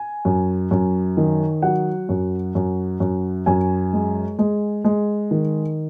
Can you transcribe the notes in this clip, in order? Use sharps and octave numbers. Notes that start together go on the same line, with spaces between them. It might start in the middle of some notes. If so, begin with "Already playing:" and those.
Already playing: G#5
F#2
F#2
D#3
F#3 F#5
F#2
F#2
F#2
F#2 G#5
G#3
G#3
G#3
D#3